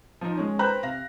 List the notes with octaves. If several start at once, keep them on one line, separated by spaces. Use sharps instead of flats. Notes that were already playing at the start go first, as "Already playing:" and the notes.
F3 D#4
G#3 C#4
B4 C5 G5 A#5 B5 F#6
C3 F5 A#6